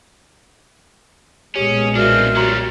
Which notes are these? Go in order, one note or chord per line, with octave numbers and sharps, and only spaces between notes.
B1 A#2 G#3 C#4 G4 G#4
C4 D4 F4 F#4 A#4 E5 F6
F#3 G3 F#4 A#5 C6